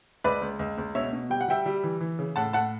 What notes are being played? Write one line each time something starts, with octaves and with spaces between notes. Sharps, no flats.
C#2 B4 D5
C#2
C#2
C#2
B2 C#5 E5
B2
G3 G5
F#5
G3 E5 G5
G3
E3
E3
C#3
A2 F#5 A5
A2 F#5 A5